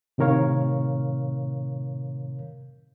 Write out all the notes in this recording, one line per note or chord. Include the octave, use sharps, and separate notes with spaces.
A2 C3 D#3 A#4 C#5 F5